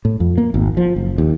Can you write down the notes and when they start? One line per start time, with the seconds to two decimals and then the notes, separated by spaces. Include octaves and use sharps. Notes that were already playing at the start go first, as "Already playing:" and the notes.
0.05 A2
0.20 F2
0.38 A#3
0.54 G#1
0.77 F3
0.96 F#1
1.18 D#2